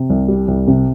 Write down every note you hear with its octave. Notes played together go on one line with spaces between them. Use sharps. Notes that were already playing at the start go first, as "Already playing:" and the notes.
Already playing: C3
C2
G3
C2
C3